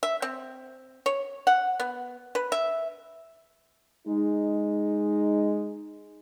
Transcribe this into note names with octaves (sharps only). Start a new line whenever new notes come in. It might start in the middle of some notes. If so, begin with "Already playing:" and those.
E5
C4
C#5
F#5
B3
B4
E5
G#3 D#4